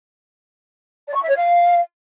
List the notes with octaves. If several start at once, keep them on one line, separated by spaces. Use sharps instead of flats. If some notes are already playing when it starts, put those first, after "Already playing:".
D5
C#6
E5
C#5
F5